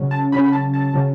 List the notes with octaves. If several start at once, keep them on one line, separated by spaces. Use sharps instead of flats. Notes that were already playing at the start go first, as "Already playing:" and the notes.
Already playing: C#3 F#3 C#4
A5
C#3 F#3 C#4 B5
B5
A5
A5
C#3 F#3 C#4